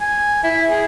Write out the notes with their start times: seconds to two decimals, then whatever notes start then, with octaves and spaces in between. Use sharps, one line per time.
0.01 G#5
0.43 E4
0.69 G#4